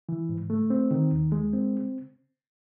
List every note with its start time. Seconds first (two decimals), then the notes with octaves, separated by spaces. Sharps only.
0.09 E3
0.29 G#2
0.50 A3
0.70 C4
0.91 D#3
1.12 D#2
1.32 G#3
1.53 C4